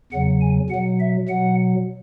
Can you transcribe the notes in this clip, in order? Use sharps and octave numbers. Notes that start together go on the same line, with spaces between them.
E2 C#3 F#3 F#5
G#5
B2 F#3 F#5
E5
B2 F#3 F#5